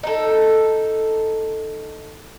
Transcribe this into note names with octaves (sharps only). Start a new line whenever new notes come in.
D#4 A4